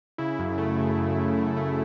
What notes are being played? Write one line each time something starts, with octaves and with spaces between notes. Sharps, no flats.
C#3 E4
F#2
A3
C#3
F#2
F#2
A3
A3